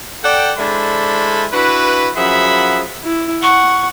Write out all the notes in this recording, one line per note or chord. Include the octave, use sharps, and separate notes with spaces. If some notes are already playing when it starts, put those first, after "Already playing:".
A4 D5 F#5 G5
G#3 D4 E4 A4 C5 B5
D4 E4 F#4 B4
F#2 F3 G#4 E5 F#5 B5
E4
F#5 C#6